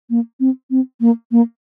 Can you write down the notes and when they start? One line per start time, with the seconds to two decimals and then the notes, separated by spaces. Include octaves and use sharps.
0.10 A#3
0.40 C4
0.70 C4
1.01 A#3
1.32 A#3